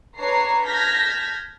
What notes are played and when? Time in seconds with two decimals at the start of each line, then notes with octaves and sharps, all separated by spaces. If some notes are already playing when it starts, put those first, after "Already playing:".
0.17 D4 B4 C#5 A5 A#5 C7
0.66 A5 F6 G6 G#6 A#6 B6